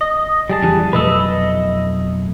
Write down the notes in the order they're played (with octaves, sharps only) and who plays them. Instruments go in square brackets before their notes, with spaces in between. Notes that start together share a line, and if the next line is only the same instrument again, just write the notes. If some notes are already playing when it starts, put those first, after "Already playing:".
[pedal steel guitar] D#5
G3 G#4 A5
[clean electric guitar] F2 E3
[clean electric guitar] B1 F2 A3 [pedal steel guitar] B4 D#5 E6
[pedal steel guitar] D#5